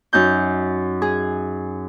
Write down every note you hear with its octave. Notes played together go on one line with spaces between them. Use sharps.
F#2 D#4 G6
G#4